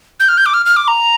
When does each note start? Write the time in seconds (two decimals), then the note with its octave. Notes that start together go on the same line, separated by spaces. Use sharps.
0.20 G6
0.29 F6
0.37 G6
0.46 D6
0.54 F6
0.66 F6
0.76 D6
0.88 A#5